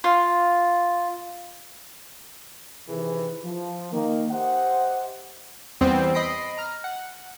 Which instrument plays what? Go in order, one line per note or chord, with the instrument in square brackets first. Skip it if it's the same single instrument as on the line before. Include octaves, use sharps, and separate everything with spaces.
[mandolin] F4
[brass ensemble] C3 D#3 E3 G#4
F3
D#3 A#3
G4 C5 D#5 E5 F#5
[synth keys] E2 G3 B3 C4
D#5 B5 A#6 C7 D7
A#5 F6
F#5